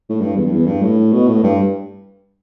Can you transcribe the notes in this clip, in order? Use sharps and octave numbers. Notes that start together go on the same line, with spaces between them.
A2
G2
E2
G2
E2
G2
A2
B2
A2
G2